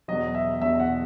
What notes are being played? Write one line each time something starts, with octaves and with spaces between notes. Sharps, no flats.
E2 B2 F#3 D#5
E5
E2 B2 F#3 E5
F#5